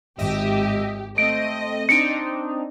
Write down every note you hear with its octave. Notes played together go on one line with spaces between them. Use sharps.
G#1 G4 D#5 E5
A3 C4 D#5 D7
C4 D4 D#4 C#7 D7